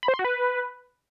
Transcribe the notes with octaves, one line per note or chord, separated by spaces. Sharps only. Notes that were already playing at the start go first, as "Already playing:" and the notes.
B5
C5
C6
F#4
B4